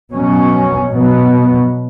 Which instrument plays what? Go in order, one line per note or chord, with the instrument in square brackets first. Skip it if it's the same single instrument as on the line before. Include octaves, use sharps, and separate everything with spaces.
[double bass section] B2 F#3 C#4
B2 F#3 B3